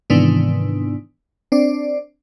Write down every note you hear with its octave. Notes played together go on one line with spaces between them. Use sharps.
G#2 C3 D#3 E3 B3 D4
C4 D4 D5